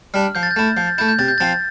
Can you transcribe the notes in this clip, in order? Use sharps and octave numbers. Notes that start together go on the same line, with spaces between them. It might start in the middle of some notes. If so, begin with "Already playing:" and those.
G3 D4 F6
F3 G6
A6
G6
A3 E4
F3 G6
A6
A3 E4 G6
G6
C3 A6
G6
F3 C4 F4 A6